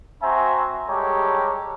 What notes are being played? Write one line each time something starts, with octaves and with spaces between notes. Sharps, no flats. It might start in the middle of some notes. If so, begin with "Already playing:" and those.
C4 F#4 C5 E5 G#5 A#5
G3 G#3 G4 A4 C#5 A#5